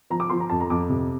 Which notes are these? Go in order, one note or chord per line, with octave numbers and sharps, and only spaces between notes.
F3 A#5
D6
F3 C6
A#5
F2 A5
A#5
F2 D6
C3